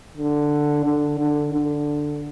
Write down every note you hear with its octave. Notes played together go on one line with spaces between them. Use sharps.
D3
D3
D3
D3